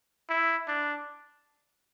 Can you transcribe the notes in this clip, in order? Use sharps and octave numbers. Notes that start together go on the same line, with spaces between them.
E4
D4